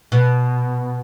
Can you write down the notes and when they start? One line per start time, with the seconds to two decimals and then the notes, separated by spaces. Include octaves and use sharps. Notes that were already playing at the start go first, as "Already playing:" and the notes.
0.12 B2